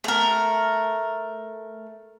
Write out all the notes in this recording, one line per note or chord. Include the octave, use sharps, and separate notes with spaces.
A3 A#4